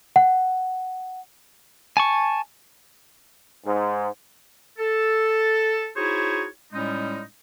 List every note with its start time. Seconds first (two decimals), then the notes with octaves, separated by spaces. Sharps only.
0.16 F#5
1.97 G#5 A5 C#6
3.65 G#2
4.78 A4
5.96 D#4 E4 F#4 G#4 C5 C#5
6.73 A2 G3 G#3 C#4 D#4